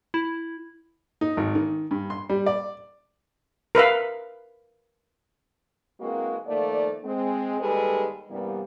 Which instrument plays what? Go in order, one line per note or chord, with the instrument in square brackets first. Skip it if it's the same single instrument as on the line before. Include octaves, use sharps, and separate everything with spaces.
[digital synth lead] E4
[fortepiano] D#4
G#1
D#3
G2
C6
G3
D5
[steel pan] A#4 B4 E5 F5
[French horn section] E3 G#3 A#3 C4 F#4 A#4
D#3 F3 A3 A#3 D5
G#3 C4
D#2 G3 G#3 A4 B4
G2 C3 E3 G3 A#3 B3